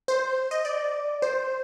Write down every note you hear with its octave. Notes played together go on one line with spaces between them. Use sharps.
C5
D#5
D5
C5